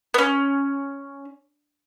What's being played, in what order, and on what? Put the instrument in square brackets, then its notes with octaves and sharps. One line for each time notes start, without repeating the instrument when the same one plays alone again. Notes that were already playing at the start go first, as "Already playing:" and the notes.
[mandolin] B3 C#4